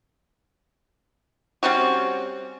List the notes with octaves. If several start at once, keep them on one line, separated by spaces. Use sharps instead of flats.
G3 C4 C#4 F#4